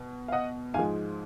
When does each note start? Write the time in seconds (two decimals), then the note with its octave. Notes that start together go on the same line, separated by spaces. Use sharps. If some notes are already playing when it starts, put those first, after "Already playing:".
Already playing: B2
0.28 F5
0.32 D#5 F#5
0.74 G#2 F5 G#5
0.77 F3 G#3